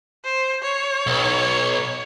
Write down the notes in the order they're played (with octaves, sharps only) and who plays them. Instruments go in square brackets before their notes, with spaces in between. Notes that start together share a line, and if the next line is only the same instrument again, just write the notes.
[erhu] C5
C#5
[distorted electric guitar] B1